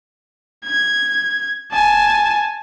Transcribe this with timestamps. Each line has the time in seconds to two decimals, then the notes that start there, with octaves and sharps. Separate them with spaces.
0.65 G#6
1.72 G#5 A5